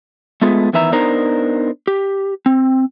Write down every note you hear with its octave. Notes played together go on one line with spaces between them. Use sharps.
G#3 A3 B3 F4 G#4
E2 D#3 E3 B4 E5 A#5
B3 D4 D#4 A#4 C5 A#5
G4
C4